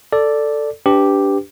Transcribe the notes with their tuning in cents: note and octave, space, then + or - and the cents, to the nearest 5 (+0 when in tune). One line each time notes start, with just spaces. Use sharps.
A4 +10 D5 +0
D4 -20 G4 +0 B4 +15